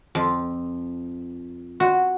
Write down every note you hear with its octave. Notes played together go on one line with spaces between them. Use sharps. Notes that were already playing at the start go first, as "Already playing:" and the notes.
F2
F#4